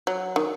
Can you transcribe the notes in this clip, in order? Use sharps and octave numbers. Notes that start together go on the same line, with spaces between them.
F#3
D#3